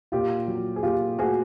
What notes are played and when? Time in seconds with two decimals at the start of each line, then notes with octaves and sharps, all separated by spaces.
0.12 A#2 F4 G4
0.48 F#3
0.76 G#4
0.83 A#2 F4 G4
1.19 A3 F#4 G#4